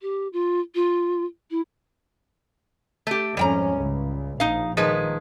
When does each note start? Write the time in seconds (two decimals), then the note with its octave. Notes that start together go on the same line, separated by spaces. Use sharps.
0.02 G4
0.33 F4
0.75 F4
1.51 E4
3.07 A3 G4
3.37 F2 G#2 G3 C#4 G5 A#5
3.78 C#2
4.40 A#1 D#4 F5
4.77 D#3 F3 G#3 B4